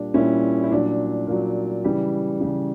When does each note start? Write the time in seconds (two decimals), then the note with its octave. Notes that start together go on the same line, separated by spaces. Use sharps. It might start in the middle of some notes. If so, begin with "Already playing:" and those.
Already playing: A#2 G3 D4
0.14 A#2 G3 C#4 E4
0.63 E4
0.71 A#2 F#3 D4
1.27 A#2 F#3
1.84 C#3 E3 G3
2.41 C#3 E3 G3